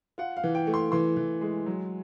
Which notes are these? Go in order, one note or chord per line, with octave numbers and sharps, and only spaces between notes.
F4 F#5
F5
E3
G5
A3
C6
E3 C6
E3
G#3
F#3